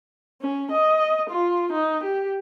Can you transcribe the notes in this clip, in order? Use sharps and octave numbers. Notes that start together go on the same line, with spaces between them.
C#4
D#5
F4
D#4
G4